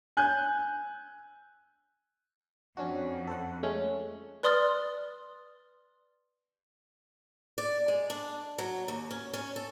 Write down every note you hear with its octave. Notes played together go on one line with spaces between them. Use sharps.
G#5 F#6 G6
F2 C#4 D4 F#4
A4 C5 F#5
G#3 A3 C#4
B4 D5 C6 D#6 F6 A6
D5
G#3
D4
F#3
D#2
C#4
C#4
A4